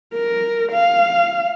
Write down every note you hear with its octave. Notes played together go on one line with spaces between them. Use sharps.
A#4
F5